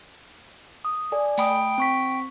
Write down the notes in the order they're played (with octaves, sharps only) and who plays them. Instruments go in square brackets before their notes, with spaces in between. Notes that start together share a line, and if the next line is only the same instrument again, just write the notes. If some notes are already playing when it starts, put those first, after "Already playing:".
[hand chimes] D#6
A4 D5 G#5
[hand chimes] A3 B5 D#6 [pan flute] G5
[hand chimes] C4 C#6 B6